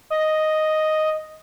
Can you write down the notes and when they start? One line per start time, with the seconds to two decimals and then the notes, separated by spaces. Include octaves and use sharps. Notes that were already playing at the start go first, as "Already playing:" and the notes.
0.10 D#5